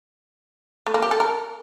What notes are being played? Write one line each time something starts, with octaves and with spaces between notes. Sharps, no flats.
A3
A#3
G4
A4
A#4